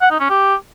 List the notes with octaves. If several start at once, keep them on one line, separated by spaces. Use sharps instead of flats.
F#5
D#4
C#4
G4